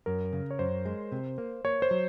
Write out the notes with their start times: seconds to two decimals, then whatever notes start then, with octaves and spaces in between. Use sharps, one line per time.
0.06 F#2 A#4
0.33 C#3
0.51 C#5
0.59 F#2 C5
0.86 G#3
1.12 C3
1.38 A#3
1.65 A#3 C#5
1.82 C5
1.91 F#3